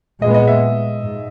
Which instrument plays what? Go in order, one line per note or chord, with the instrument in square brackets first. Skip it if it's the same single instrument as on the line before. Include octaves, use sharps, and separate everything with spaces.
[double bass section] A#2 G#3 B3 [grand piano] D#5
[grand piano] D#5
E5
[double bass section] G#2